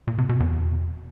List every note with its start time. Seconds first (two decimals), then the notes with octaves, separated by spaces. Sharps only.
0.07 A#2
0.18 C3
0.29 B2
0.40 E2